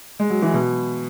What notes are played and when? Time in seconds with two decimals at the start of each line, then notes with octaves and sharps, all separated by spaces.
0.20 G#3
0.30 F#3
0.43 E3
0.54 B2